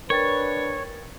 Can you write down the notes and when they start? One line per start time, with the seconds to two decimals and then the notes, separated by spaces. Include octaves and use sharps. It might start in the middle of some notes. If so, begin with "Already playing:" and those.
0.10 D4 A#4 B4 C#5 G5 A6